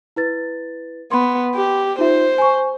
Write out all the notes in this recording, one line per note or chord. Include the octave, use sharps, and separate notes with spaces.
E4 B4 A6
B3 B5 C6
G4
D#4 F4 C5 E5
G#5 C#6